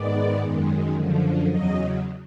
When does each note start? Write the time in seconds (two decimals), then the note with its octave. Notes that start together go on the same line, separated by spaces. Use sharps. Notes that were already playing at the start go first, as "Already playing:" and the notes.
Already playing: G#2 D#3 G#3 B3 D5
0.42 F#2 D#3 G#3
0.94 F#2 D3 F3
1.47 E2 C#3 F#3 D#5